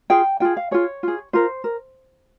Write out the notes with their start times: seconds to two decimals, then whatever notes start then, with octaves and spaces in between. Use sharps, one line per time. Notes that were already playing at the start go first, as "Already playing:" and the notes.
0.10 F4 G#4 G5
0.40 F4 G#4 G5
0.57 F5
0.71 F4 G#4 C#5
1.03 F4 G#4
1.33 F4 A#4 C5
1.64 A#4